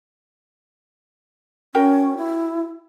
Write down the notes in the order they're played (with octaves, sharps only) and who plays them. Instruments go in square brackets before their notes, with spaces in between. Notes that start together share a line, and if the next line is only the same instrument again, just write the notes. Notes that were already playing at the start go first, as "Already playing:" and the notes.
[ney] C#4 [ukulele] F#4 A#4 G5
[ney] E4